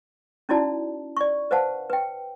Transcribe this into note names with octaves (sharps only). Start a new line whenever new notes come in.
C#4 D#4 E4 F#4 D5 A5
D5 C#6
B4 C5 F5 F#5 A5
B4 G5